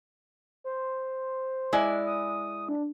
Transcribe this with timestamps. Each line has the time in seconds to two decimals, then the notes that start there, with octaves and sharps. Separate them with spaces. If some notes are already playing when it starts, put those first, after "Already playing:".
0.64 C5
1.73 G#3 E4 D5
2.05 D#6
2.69 D4